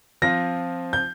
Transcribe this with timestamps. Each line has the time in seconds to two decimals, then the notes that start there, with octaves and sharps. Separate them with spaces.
0.22 F3 C4 F4 A#6
0.93 G6